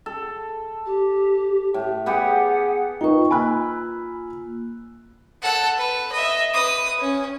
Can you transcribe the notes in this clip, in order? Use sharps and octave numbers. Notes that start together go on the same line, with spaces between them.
A4
G4
A2
B3 G4 G#4 F#5
D#4 F4 B4 G5 C#6
A#3 F4 G#5 B5 E6 F#6
A4 F#5
B4
D#5 E5
B4 D#6
C#4